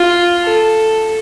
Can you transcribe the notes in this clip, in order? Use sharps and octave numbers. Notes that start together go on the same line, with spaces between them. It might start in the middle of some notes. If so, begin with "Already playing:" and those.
Already playing: F4
A4